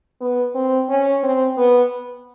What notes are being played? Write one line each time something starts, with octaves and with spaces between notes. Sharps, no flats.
B3
C4
C#4
C4
B3